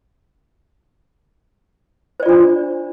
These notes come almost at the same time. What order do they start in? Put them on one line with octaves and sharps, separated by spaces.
C5 D5 F4 D4